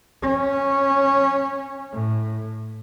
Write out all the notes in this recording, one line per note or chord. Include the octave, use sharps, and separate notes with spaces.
C#4
A2